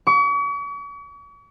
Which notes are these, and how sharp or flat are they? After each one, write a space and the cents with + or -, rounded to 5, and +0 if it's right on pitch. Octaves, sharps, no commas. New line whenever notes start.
C#6 +45